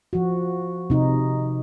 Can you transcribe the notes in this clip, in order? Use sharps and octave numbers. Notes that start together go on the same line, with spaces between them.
F3 F#4
C3 D#4